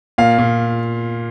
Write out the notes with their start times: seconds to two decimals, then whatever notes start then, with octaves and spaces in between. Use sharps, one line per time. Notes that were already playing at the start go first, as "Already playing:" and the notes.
0.18 A#2 F5
0.38 A#2